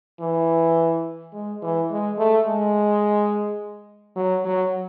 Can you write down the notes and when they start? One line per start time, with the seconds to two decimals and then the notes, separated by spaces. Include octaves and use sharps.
0.20 E3
1.33 G#3
1.62 E3
1.90 G#3
2.18 A3
2.47 G#3
4.16 F#3
4.45 F#3